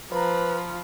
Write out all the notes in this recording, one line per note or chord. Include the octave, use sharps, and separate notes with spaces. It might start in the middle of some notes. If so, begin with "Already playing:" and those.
F3 B4 C5 A#5 B5